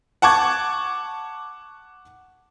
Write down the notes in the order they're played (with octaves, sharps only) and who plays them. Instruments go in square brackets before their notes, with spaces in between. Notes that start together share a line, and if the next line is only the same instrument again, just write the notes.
[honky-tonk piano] F#5 A5 C#6 D6 G#6